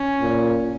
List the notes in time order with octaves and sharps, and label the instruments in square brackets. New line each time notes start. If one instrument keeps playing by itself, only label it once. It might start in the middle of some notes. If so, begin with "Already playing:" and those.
Already playing: [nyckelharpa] C#4
[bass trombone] A#2